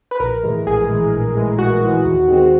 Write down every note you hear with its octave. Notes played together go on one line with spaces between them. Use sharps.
B4
A#1 A#4
A2 E3 G#3
A#1 G#4
A2 E3 G#3
A#1
A2 E3 G#3
A#1 F#4
A2 E3 G#3
D#2
D#3 G#3 C4